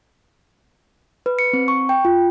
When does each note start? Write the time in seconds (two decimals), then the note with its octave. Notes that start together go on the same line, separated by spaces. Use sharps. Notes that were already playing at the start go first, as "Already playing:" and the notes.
1.26 B4
1.39 C#7
1.53 C4
1.68 C#6
1.89 G5
2.05 F4